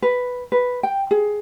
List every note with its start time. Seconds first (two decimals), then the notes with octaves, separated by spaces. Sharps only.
0.02 B4
0.52 B4
0.83 G5
1.11 G#4